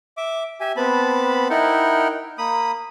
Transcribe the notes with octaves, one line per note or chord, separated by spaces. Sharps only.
E5 D6
G4 E5 G#5
B3 C4 A5 B5
D#4 E4 A#4 F#5 G5
A#3 B5 D#6